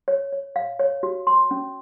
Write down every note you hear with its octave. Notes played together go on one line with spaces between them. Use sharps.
C#5
C#5
F5
C#5
F#4
C6
C#4